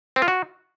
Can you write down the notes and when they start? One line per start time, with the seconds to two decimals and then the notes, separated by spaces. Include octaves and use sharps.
0.16 C4
0.22 F4
0.28 F#4